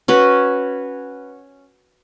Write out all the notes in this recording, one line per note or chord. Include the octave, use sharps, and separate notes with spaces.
C#4 F#4 B4